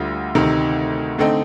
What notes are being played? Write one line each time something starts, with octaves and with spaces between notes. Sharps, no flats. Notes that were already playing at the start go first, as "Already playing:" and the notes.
Already playing: D2 D3 G3 F4
D2 C3 D#3
D3 A3 C4 D#4